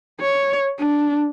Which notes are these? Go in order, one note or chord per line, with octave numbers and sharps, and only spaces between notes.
C#5
D4